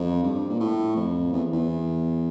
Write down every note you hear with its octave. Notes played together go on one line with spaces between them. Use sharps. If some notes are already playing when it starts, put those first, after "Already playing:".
Already playing: F2
G2
A#2
A2
F2
E2
E2